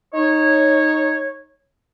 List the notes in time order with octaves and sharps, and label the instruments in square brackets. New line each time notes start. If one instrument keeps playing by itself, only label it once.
[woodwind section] D#4 C#5